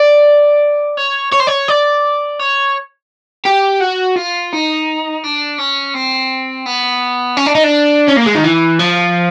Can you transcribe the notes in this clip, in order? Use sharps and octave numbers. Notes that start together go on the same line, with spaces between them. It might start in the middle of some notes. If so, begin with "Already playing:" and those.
Already playing: D5
C#5
C#5
C5
C#5
D5
C#5
G4
F#4
F4
D#4
D4
C#4
C4
B3
C#4
D4
D#4
D4
C#4
A#3
G#3
D#3
E3
F3